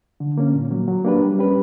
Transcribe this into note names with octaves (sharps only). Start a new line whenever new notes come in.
D3
A#3 C#4
A#2
F#3 A#3
F#3
A#3 D4 G4 B4
G3
C#4 G4 B4